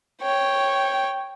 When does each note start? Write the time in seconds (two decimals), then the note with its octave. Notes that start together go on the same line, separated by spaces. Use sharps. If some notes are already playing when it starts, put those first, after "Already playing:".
0.22 C#5 G5